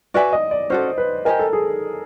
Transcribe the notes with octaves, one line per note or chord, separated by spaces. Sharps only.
F#4 B4 D5 E5 G#5
D#5
D5
C#4 F#4 A4 C5
B4
G4 A#4 C5 D#5 G#5
A4
G#4